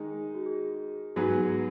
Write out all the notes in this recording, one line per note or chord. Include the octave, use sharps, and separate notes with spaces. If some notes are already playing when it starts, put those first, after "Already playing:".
Already playing: D#3 G#3 D#4 G#4
F#4
G#4
G#2 F#3 B3 F#4 G#4